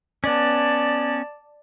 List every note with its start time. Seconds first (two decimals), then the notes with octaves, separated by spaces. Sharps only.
0.24 B3 C#4 D5 A5